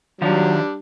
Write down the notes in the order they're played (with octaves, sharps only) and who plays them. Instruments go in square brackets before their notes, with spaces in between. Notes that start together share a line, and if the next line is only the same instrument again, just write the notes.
[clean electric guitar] D#3 F4 F5 [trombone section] F#3 [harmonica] G3 D4